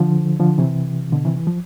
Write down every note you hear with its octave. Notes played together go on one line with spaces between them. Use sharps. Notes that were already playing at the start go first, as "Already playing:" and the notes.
Already playing: D3 F3
D3 F3
C3 E3
B2 D3
C3 E3
E3
F3